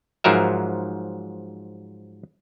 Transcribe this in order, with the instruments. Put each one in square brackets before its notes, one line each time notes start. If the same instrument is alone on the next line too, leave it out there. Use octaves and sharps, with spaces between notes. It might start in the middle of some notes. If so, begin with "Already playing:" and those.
[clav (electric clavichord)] G#2 F3 F#3 A#4 E5